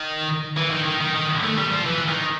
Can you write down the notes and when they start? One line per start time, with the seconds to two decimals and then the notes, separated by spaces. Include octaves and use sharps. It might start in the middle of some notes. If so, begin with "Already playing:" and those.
Already playing: D#3
0.57 E3
0.71 D#3
0.85 D#3
1.01 D#3
1.14 D#3
1.43 A3
1.58 G3
1.72 F3
1.86 E3
2.08 D#3